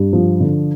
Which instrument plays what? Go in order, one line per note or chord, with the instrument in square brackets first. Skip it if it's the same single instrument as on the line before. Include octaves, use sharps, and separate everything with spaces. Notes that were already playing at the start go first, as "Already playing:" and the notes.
Already playing: [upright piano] G2
F3
D3